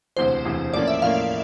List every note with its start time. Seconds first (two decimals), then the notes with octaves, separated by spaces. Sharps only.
0.17 E1 D2 C3 E3 C5
0.45 E1 D2 C3 E3
0.74 A2 F3 A#3 C#4 D5
0.88 E5
1.02 A2 F3 A#3 C#4 F5